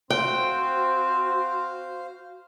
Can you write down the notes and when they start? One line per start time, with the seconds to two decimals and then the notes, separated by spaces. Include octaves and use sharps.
0.10 C4 F#4 C5 F5 G5